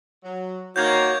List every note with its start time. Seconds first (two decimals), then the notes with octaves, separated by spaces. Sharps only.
0.24 F#3
0.76 D#3 A#3 F#4 C#5 G6 G#6